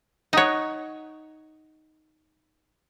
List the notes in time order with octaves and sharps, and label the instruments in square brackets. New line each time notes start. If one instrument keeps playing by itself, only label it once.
[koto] D#4 C#5 [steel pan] D#5 F#5